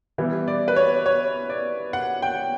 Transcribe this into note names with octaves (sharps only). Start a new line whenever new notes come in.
E3 G3 B3 E4
D5
B4
C#5
C#5
D5
F#5
G5